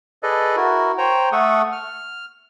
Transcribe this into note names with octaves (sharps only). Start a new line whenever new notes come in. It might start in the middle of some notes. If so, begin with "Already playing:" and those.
G#4 A4 B4 D5 D#5
E4 F#4 A#4
C5 C#5 G5 A#5
A3 A4 F#5 C#6 D#6
F6